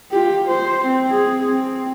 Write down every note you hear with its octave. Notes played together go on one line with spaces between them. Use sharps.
F4 G4
C5
C4
G#4
C4